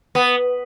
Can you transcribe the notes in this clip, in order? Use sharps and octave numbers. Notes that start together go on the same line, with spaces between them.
B3